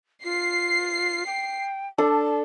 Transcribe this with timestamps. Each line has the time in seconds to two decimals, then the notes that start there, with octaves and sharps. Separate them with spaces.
0.24 F4 C7
1.26 G5
1.98 D4 A4 A5